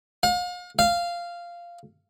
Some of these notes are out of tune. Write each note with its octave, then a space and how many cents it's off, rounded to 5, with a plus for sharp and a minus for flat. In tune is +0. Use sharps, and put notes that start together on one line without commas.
F5 +40
F5 -10